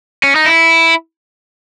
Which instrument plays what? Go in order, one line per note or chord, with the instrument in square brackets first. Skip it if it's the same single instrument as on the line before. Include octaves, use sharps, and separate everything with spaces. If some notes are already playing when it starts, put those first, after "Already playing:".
[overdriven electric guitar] C#4
D#4
E4